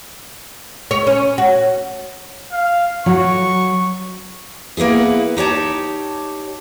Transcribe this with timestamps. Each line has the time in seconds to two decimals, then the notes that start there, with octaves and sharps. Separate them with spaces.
0.91 C#5
1.07 C#4
1.38 F#4
2.52 F5
3.06 F#3 C#6
4.77 A#3 B3 E4 G#4
5.36 D#4 G4 C#5 A5